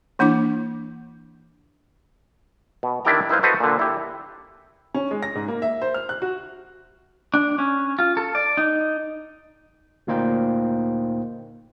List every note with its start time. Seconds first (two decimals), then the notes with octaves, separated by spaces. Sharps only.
0.19 E3 A#3 D4 E4 D6
2.83 B2
3.05 D#3 D4 E4 G4 G5 A#5
3.29 D#4 E4 B4 C5 F5
3.43 F#4 A4 B4 C5 D#5
3.60 A#2 D3
3.79 E4 G4
4.94 C#4
5.11 G#3
5.23 A#6
5.35 G#2
5.48 A#3
5.62 E5
5.82 C5
5.94 F6
6.09 F#6
6.22 F#4
7.34 D4
7.58 C#4
7.99 F4
8.17 A4
8.35 D5
8.57 D#4
10.07 D2 A#2 A#3 D#4 C5 G5